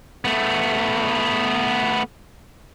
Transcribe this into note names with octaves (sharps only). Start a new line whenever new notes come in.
A3 B3